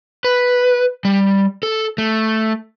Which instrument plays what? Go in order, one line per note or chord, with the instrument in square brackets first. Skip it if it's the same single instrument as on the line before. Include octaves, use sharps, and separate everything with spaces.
[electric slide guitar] B4
G3
A4
A3